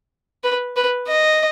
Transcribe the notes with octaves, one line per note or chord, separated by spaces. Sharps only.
B4
B4
D#5